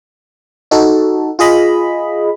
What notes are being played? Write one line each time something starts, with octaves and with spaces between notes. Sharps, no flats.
D#4 F#4 A4
F4 G#4 D#5 B5